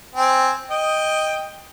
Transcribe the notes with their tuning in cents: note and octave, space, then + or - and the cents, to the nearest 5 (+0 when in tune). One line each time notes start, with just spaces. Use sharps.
C4 +0 G#5 +0
D#5 +0 G5 +10